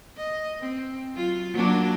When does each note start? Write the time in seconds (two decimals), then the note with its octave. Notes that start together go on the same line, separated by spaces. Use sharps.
0.17 D#5
0.60 C4
1.13 F#3 F4
1.52 F#3 A#3 D4